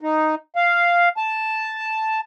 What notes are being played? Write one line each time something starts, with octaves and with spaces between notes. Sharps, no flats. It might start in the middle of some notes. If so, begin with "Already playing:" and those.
D#4
F5
A5